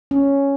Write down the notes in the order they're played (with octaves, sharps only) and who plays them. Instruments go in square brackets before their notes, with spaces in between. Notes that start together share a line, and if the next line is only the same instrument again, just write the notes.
[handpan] C#4